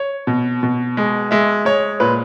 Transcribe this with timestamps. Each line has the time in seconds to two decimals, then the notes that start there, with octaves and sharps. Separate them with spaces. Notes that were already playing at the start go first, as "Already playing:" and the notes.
Already playing: C#5
0.27 B2
0.63 B2
0.97 G#3
1.31 G#3 E5
1.65 G#3 C#5
2.00 A#2 B4